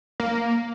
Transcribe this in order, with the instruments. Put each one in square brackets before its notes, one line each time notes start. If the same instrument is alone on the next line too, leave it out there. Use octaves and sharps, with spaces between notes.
[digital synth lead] A#3